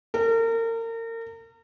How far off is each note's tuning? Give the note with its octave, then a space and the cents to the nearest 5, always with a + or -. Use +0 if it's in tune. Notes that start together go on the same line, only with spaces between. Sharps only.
A#4 -35